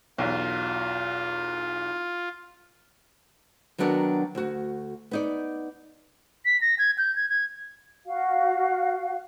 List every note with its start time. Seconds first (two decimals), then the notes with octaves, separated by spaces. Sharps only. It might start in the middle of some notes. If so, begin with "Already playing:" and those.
0.18 B1 E2 F4
3.78 D#3 F#3 B3 D4 F#4 A#4
4.35 D2 F#4
5.11 B3 D#4 D5
6.45 B6
6.61 A#6
6.79 G#6
6.98 G6
7.16 G#6
7.29 G#6
8.06 F#4 F5